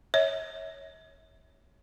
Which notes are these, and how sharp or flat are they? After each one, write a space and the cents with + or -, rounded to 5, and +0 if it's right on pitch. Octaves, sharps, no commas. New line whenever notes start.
C#5 +0 E5 -35